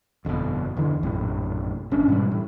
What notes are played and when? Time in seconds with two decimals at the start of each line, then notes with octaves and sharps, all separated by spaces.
0.25 G1 F2 G#2 B2
0.77 E2 D3 E3
1.03 A#1 F#2 A2 C3
1.91 G1 C#4 D4
2.08 G#2 B2 E3 G3
2.32 A2